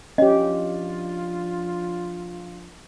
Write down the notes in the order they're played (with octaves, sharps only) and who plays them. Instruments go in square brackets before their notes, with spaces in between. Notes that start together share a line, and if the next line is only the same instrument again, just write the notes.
[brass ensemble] F3 D4 F4 [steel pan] C#4 G4 [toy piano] D#5